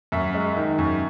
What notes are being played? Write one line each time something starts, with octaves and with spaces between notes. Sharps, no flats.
F#2 E5
G#3
D#3
F#2